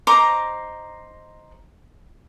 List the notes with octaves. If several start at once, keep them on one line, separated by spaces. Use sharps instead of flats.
D#4 C5 A#5 D6